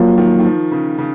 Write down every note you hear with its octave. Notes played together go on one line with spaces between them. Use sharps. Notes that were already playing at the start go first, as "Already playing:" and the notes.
Already playing: F3 F#3 A#3 F4
D#3
D#3
F3
C#3
C#3